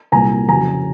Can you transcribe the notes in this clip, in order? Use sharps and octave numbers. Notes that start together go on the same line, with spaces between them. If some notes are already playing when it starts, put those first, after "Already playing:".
C2 A#2 F#3 A#3 G#5 A#5
F2 C#3 F#3 G#5 A#5